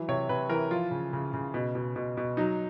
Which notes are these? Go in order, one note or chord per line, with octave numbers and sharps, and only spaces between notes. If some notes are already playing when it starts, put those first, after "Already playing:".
Already playing: E3 F#3
C3 C#5
C3 B4
E3 A#4
F3 F4
C#3
C#3
C#3
B2
B2
B2
B2
F#3 D#4